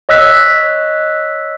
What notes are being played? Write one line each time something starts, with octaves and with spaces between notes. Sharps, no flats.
C#5 D#5 E6 F#6 B6